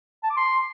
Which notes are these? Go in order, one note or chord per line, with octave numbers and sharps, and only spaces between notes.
A5
D6
C6